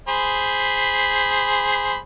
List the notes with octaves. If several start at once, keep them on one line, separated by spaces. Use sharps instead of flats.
G#4 C5 B5